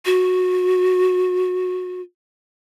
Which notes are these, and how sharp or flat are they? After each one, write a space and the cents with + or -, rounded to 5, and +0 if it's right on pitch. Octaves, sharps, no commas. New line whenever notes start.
F#4 -20